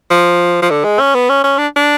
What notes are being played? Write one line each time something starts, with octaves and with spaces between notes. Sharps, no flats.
F3
F3
D3
G#3
C#4
B3
C#4
C#4
D4
D4